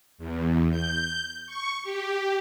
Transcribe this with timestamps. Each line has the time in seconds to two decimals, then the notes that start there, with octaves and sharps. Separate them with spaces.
0.18 E2
0.71 G6
1.47 C#6
1.83 G4